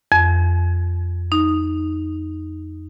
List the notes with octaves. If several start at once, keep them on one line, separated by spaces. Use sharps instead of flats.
F2
D#4